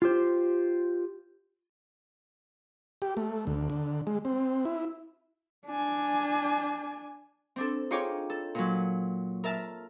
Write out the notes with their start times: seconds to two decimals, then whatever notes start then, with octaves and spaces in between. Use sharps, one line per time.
0.02 F4 G4 C5
3.02 G4
3.17 A3
3.47 D2
3.70 D3
4.07 G#3
4.25 C4
4.65 E4
5.66 D4 G#5
7.56 C4 D4 A4
7.91 D#4 F4 G#4 C#5 G5 D6
8.30 A4
8.55 A#2 F#3
9.44 A#4 E5 A5 F6